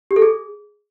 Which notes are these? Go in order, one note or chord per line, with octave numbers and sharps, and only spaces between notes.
G4
A4
G#4